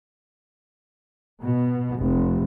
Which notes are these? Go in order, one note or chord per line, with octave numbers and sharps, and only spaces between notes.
B2
F1